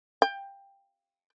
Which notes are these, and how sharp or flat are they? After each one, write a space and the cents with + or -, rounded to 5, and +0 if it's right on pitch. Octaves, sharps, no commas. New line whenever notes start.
G5 +15